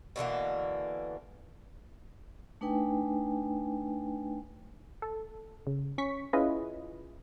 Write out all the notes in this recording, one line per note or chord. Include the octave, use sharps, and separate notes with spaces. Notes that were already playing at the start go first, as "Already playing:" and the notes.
B2 D3 E3 A#3
A3 D4 D#4 B4 G5 G#5
A4
C#3
C#4 C#6 B6
C#4 E4 F4 G#4 B4 D#5